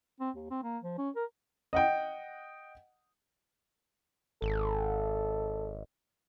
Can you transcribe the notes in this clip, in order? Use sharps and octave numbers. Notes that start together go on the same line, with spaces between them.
C4
D#2
C4
A#3
F3
C#4
A#4
D#5 F#5 G5
G#1 A4